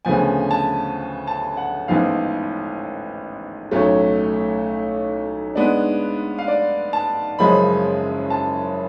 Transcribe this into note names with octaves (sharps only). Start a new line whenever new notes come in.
D2 C#3 F3 B3 G#5
A5
A5
F#5
A1 G#2 F3 B3 F5
B1 A2 F#3 A3 C#4 C#5
G#2 G#3 B3 D4
F5
D5
A5
F#1 F#2 C#3 F3 G#3 B5
A5